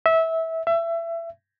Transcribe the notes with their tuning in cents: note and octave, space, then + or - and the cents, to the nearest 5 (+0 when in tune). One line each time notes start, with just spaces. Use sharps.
E5 -20
E5 +25